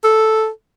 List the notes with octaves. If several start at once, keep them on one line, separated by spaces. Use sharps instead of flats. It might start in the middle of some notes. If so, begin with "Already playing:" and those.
A4